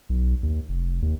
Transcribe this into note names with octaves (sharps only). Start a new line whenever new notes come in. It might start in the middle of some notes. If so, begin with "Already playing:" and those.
B1
D#2
F1
D#2